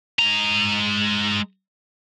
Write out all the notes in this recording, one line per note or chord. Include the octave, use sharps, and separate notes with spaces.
G#3 A#5